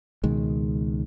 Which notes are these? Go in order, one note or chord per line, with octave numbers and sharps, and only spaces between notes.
C#2 B2 D#3 G#3